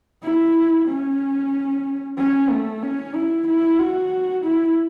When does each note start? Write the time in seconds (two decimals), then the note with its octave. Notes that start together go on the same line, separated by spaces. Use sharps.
0.23 E4
0.88 C#4
2.18 C#4
2.50 A3
2.83 C#4
3.15 E4
3.47 E4
3.79 F#4
4.44 E4